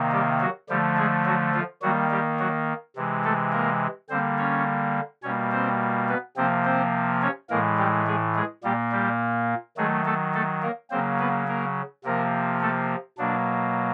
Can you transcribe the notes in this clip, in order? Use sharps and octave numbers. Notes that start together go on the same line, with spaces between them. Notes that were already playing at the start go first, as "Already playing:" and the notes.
Already playing: C3 D#3 A#3
G3 G4
F#3 F#4
D3 F3 G3 A3 G4
G#3 G#4
F#3 F#4
F3 F4
D#3 F#3 G3 A#3 F#4
G3 G4
F#3 F#4
C3 E3 G#3
A3 A4
A#3 A#4
D3 G3 A#3 C4 C5
C#4 C#5
B2 G3 A#3 C#4 C#5
C4 C5
B3 B4
C3 F3 A#3 C4 C5
C4 C5
C#4 C#5
A2 E3 G#3 A#3 A#4
G3 G4
G#3 G#4
G#3 G#4
A#2 G3 A#3 G4
G3 G4
D#3 F#3 G#3 A3 G#4
A3 A4
A3 A4
A#3 A#4
C#3 F#3 A#3 C4 C5
B3 B4
A#3 A#4
C3 F3 A#3 A#4
A3 A4
B2 F#3 A#3 D4